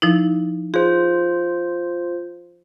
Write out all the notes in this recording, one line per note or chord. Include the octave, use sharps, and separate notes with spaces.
F3 D#4 E4
F4 G#4 C5